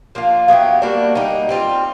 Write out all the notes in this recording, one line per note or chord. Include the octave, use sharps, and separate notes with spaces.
F3 A#3 D4 F4
F#3 B3 E4 G4
G3 A#3 D4 F#4
G3 A#3 D#4
G3 C4 F4